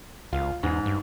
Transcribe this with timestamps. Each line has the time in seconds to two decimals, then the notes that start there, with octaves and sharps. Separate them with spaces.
0.33 C#2 F4
0.63 E2 G#2
0.86 G2